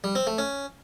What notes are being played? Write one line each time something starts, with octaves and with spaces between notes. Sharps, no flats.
G3
C4
A3
C#4